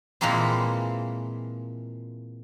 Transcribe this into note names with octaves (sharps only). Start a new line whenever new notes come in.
A#2 E3 F3 G#3 A#3 C4